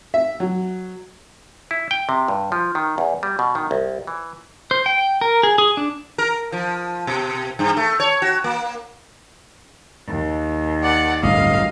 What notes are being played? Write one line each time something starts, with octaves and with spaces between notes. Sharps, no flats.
E5
F#3
E4
G5
C3
G2
F3
D#3
E2
G3
B2
D#3
C2
E3
C5
G5
A#4
G#4
G#4
D4
A#4
F3
B2
G2
A3
C#5
F#4
A#3
D#2
D5 F#5
A1 D2 G2 D#5 F5